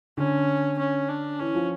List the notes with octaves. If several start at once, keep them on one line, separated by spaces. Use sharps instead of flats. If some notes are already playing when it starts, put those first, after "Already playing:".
D3 C#4
C#4
D4
E3 C#4
F3